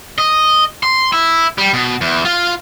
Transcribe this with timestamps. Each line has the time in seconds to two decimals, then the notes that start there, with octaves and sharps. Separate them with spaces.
0.18 D#5
0.83 C6
1.13 E4
1.58 G3
1.74 B2
2.01 E2
2.25 F4